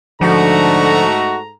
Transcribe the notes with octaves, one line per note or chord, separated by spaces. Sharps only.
G#2 D3 F3 A3 D#4 F#4 A4 A#5